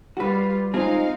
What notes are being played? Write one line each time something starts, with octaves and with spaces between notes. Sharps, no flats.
G3 F4 F#4 B4
G#3 C4 D#4 F4 G#4 F5